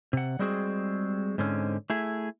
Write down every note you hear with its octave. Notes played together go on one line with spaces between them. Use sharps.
C3 F#5
G3 G#3 C4 F#4 G#4
G#2 D3 C4 C#4
A3 E4 G#4